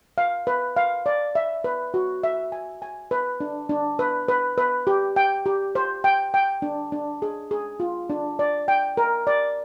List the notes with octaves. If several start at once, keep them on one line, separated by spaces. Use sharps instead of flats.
F5
B4
F5
D5
E5
B4
F#4
E5
G#5
G#5
B4
D4
D4
B4
B4
B4
G4
G5
G4
C5
G5
G5
D4
D4
G#4
G#4
F4
D4
D5
G5
A#4
D5